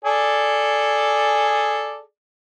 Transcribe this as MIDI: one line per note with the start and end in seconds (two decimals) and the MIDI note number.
0.05 2.01 68
0.05 2.01 69
0.05 2.01 74